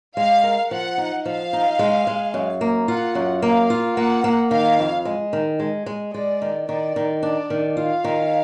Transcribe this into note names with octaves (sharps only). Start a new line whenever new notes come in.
G#3 F5
A#4
F3 F#5
D#4
F3 F5
D#4
G#3
G#3
F#2
A#3
F4 F#5
F#2
A#3 F5
F4
A#3 F#5
A#3
D#3 F5
F2
G#3
D#3
G#3
G#3
G#3 D5
D#3
D#3 D5
D#3
D4 D5
D#3
F4 F5
D#3